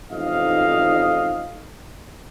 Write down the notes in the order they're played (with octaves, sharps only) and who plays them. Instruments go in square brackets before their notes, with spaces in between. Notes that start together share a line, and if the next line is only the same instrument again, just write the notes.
[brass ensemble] A1 F2 G#2 D#4 D#5 F5